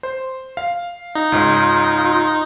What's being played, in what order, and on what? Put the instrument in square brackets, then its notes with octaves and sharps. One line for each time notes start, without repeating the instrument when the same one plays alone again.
[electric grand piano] C5
F5
[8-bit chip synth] D#4
[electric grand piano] C#2 G#2 [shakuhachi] F4